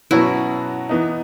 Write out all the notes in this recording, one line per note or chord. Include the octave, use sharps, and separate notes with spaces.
B2 F#3 C#4 E4 F#4 B4
E3 B3 D#4